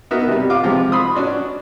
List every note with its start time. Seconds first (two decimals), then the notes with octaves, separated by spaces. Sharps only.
0.11 B3 D#4 F#4 A#4 E5
0.28 C3 G3
0.50 F4 D6
0.63 C3 F3 G#3
0.92 B5 C6 D#6
1.15 C#4 D4 F#4 D5